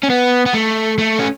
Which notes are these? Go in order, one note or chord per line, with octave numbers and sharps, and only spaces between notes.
C#4
B3
B3
A3
A3
C#4